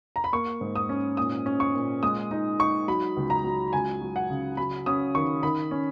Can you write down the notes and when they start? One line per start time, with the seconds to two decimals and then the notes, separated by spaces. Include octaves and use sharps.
0.16 A#5
0.24 B5
0.33 A#3 C#6
0.61 G#2
0.76 D#6
0.89 C#4
1.17 A#2 D#6
1.46 C#4
1.60 C#6
1.74 A#2
2.03 G#3 D#6
2.31 D#4
2.59 D#4 C#6
2.88 F#3 B5
3.17 C#2
3.30 A#5
3.44 F#3
3.73 C#2 G#5
4.01 F#3
4.16 F#5
4.30 C#3
4.57 F#3 B5
4.86 C#4 D#6
5.15 D#3 C#6
5.43 D#3 B5
5.71 C#4